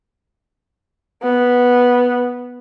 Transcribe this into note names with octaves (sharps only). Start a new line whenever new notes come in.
B3